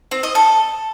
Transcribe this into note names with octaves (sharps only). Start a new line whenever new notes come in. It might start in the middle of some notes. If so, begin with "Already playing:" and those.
C4
D#5
A4